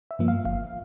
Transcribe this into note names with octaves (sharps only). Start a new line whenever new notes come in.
E5
G2 F3 A#3
F5
G1 F5